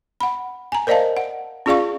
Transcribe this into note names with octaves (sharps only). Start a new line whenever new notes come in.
F#5 B5
G#5 A#5
A#4 C5 D5 D#5 F5 A5
F#5
C#4 F4 G#4 D5 F5 C#6